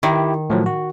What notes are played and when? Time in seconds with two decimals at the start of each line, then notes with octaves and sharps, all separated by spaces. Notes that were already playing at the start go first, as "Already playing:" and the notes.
0.03 D#3 E4 G4
0.50 A2 F3 F#3
0.66 F#4